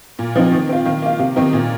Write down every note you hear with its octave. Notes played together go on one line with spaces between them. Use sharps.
A#2
F3 C4 D#4
D#3
C4 F4
D#3
A#3 F4
C3
D#3 C4 D#4
A#2